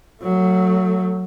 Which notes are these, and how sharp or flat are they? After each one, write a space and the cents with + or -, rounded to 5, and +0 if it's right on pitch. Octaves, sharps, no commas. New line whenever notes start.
F#3 +0 A3 +30